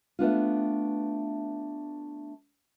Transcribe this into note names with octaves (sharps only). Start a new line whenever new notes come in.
A3 B3 D4 F4